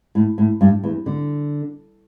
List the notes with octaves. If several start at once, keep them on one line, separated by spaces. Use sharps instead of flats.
A2
A2
G2
E2
D3